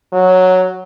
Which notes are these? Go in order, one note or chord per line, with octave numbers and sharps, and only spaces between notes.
F#3